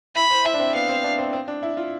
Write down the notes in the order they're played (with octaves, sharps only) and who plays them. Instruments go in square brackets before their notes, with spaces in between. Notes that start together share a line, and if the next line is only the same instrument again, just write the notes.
[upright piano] E4 [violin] B5
[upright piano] C5
[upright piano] E4 [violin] E5
[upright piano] D4
C4
[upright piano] B3 [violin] F5
[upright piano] C4
D4
C4
C4
D4
E4
F4